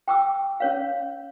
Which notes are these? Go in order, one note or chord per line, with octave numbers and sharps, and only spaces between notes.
G5 D6 E6
C#4 C#5 F5